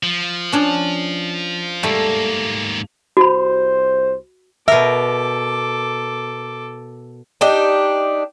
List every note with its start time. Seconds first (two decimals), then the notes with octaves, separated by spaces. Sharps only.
0.03 F3
0.52 C#4 D4 C#5
1.83 G#2 G3 A3 A#3
3.17 C2 F#4 C5 B5
4.68 B2 A4 A#4 E5 D6
7.41 D4 D#4 G4